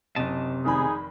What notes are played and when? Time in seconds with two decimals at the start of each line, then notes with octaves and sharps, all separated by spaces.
0.16 F#1 C3 D#5 A5
0.64 F1 D#3 D#4 G#4 B5